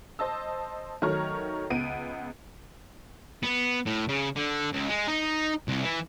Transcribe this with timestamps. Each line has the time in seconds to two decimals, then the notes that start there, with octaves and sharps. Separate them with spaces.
0.19 C5 D#5 A5 E6
1.02 D#3 F#3 A3 C#5 A#5 F6
1.70 C#2 B3 D7 D#7
3.43 B3
3.86 A2
4.09 C#3
4.37 D3
4.73 C#2
4.89 G#3
5.08 D#4
5.68 C2
5.83 E3